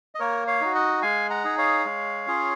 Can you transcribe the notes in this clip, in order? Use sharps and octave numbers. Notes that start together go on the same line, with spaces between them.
D#5
A#3 A#4 C#5
C#5 F5
D#4 F#4
D#5 F#5
G#3 F5 G#5
F#5 A#5
D#4 G#4
C#5 F5
G#3
C#4 F4 G#4